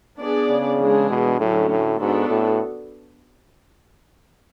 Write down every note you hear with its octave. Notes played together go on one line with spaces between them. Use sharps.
B3 D4 G#4 D5
C#3
E3 G#3 D4 G#4
B2
A2 D3 F#3 A3 C#4
A2
G#2 B3 D4 F#4 A4
A2